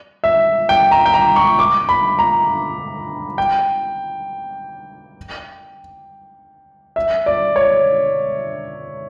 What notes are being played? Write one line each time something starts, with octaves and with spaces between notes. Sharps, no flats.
E5
G5
A#5
G5
A#5
C#6
D6
B5
A#5
G5
E5
D5
C#5